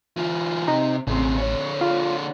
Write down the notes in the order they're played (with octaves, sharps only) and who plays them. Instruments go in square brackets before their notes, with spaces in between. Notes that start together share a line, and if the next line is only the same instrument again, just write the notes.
[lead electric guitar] E3 F4
[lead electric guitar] C3 [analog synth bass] D#4
[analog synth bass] A1 [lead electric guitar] C#3 C4
[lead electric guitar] D3 C#5
[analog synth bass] F4